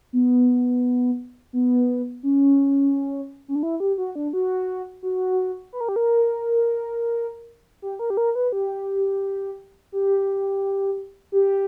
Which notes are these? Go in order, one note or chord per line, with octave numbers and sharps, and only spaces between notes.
B3
B3
C#4
C#4
D4
E4
G4
F#4
D4
F#4
F#4
B4
A#4
G4
A#4
G4
A#4
G4
A#4
B4
G4
G4
G4